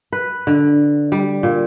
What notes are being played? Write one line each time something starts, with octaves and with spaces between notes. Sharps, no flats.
B4
D3
G3
A#2